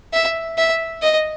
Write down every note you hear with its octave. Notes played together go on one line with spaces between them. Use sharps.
E5
E5
D#5